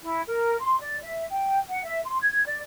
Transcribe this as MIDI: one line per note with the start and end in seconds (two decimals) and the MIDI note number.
0.01 0.21 64
0.26 0.55 70
0.59 0.76 84
0.80 0.96 74
1.01 1.23 76
1.29 1.58 79
1.68 1.79 78
1.82 1.99 76
2.04 2.19 84
2.19 2.45 92
2.45 2.59 74